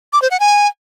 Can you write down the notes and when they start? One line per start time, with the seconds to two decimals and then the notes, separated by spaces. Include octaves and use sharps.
0.13 D6
0.22 C5
0.31 F#5
0.40 G#5